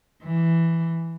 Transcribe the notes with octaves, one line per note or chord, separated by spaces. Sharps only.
E3